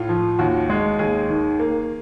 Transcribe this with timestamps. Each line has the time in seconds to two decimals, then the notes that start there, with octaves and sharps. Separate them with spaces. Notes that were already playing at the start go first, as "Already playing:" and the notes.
Already playing: A2 F4
0.09 F3
0.39 D#2 F#4
0.70 G#3
0.99 D#2 G#4
1.29 D#3
1.59 A#3